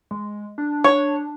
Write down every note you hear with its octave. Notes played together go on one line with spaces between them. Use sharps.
G#3
D4
C#5